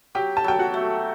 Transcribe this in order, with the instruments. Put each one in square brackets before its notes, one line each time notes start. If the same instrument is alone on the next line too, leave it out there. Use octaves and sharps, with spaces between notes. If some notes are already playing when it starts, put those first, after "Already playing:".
[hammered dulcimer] F#3 [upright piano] G4 G5
[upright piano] A5
[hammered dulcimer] F#3 [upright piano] G5
[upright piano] F#4 F#5
[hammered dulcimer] A3